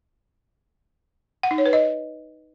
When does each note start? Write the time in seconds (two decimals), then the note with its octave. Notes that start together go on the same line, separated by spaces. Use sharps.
1.43 F#5
1.51 D#4
1.58 C#5
1.66 B4
1.73 D#5